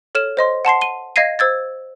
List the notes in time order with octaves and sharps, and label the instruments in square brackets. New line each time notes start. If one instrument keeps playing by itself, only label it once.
[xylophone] A4 C#5 F6 E7
C5 D#5 C6
F#5 A5 C6 C7
D#7 G7
D#5 F5 G#6 A#6 C7 D#7
C5 E6 G#6 A6